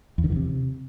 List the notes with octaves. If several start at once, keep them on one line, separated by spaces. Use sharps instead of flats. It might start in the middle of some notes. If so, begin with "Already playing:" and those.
E2
D3
E3
C3